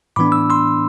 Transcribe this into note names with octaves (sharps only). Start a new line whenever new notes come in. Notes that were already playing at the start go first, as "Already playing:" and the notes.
A2 E3 B3 D4 B5 D6
E6
C6 E6